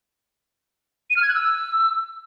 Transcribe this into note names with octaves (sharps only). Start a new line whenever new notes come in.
D#7
F6
G#6
F#6
E6